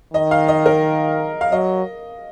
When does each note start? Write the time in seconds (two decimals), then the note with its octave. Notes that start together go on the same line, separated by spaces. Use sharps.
0.13 D#3 D#5
0.31 F5
0.48 D#5
0.66 A#4
1.41 F5
1.52 F#3 D#5